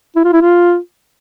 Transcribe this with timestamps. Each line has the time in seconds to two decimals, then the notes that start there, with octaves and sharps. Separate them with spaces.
0.16 E4
0.24 F4
0.33 E4
0.41 F4